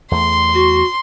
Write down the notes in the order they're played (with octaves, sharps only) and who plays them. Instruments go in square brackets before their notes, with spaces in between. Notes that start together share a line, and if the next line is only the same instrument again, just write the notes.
[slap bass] E2 A3 [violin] C6
[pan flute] F#4